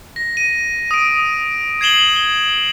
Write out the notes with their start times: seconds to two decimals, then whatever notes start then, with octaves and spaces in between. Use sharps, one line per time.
0.16 A#6
0.37 D#7
0.91 D#6 D7
1.81 G#6 C7 E7 F#7 G7
2.16 G7